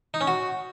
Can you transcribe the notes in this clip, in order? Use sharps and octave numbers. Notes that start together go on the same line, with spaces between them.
D#4
C#4
F#4